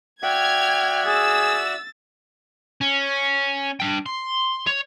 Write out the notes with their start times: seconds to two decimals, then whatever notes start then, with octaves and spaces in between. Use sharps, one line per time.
0.23 F#4 D5 E5 G5 F6 G#6
1.07 G#4 E6 A6
2.81 C#4
3.80 D4 G5
4.06 C6
4.67 C#5